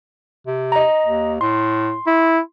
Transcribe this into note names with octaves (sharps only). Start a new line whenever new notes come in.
C3
D#5 A#5
D#2
A2 C6
E4